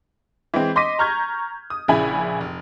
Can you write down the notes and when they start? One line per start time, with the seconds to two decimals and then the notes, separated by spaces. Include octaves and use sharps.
0.54 E3 G#3 C4
0.76 D#5 C6 D6 A#6 B6 D#7
0.99 A#5 C#6 F6 G6 G#6
1.70 D#6
1.88 A#1 C#3 E4 G#5 B5
2.41 F1